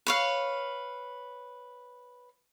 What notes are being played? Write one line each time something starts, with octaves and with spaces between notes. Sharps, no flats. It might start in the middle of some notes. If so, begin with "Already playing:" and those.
B4 C#5 F5